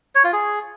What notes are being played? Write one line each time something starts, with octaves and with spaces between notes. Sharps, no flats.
C#5
F4
G#4